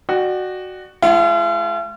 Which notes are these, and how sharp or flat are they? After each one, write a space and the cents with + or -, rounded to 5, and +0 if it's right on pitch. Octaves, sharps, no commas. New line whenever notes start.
F#4 +0 D5 +35 G5 +0
G#3 +30 F4 -45 F#5 +0